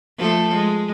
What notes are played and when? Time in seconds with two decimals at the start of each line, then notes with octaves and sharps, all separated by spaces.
0.18 F3 A3 A4
0.54 G#3